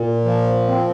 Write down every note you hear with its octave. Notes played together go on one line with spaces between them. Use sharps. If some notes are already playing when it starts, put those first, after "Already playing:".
Already playing: A#2
F3
C4